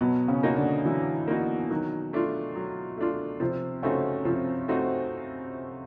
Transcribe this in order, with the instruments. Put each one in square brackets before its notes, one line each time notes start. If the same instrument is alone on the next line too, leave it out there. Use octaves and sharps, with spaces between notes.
[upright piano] B2 B3 [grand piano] F#3
[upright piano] C#3 C#4
[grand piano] A#3 D#4 F#4
[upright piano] D3 D4
[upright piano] E3 E4 [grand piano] F#3
[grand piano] A#3 D#4 F#4
[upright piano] D#3 D#4 [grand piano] F#3
[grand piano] A3 D4 F4
F#3
A3 D4 F4
[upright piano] C3 C4 [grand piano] F3
[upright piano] C#3 C#4 [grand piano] A3 C4 D#4 F#4
[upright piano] C3 C4 [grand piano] F3
[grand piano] A3 C4 D#4 F#4